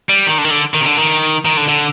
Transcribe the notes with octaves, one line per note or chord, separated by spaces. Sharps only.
G3
D#3
D3
D#3
D3
D#3
C3
D3
D#3
D#3
D3
D3